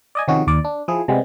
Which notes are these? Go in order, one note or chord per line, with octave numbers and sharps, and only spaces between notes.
D5 D#5 G#5
C3 D#3 F3 C#4 F#4 G#4
D#2 D5
D4
F3 E4 G#4
C3 G3 G#3 B3